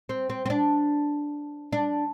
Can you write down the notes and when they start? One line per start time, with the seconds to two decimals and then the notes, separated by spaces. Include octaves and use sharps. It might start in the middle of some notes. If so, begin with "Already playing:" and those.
0.09 C4
0.30 C4
0.46 C4
0.50 D4
1.73 D4